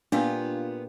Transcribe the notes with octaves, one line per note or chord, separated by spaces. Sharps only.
A#2 B3 D4 F4 G4 F5